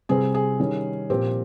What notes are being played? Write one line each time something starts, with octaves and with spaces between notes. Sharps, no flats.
C3 G3 C4 G#4
G#4
D#3 G3 C#4
A#2 F3 C4 G4